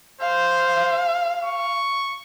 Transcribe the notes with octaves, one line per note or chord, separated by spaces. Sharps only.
C5 F5
C#6